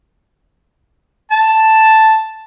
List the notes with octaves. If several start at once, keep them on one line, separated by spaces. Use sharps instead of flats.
A5